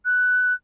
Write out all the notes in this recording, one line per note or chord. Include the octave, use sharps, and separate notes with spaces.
F#6